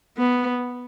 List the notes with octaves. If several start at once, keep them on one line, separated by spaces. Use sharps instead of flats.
B3